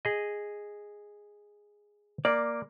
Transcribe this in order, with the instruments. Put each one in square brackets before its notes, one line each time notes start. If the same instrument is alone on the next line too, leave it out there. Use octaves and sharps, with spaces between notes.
[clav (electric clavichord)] G#4 D#5
[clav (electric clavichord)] A#3 [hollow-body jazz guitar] D5